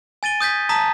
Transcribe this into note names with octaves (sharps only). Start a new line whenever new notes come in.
G#5 A6 D#7 G7
D#6 G6 G#6 B6
A5 A#5 D#6 B6